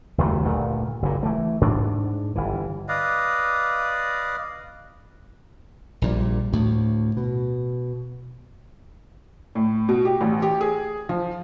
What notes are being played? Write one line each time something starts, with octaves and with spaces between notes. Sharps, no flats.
F#1 D#2 F#3 A3
G1 D2 A#2 A3
F#1 A#2
E3 A3
G#2 D4
G1 E3
B4 D5 D#5 F5
A#1 A#2 G3
D2 A2
B2
A2
B2
G4
A1
G4
G#4
F3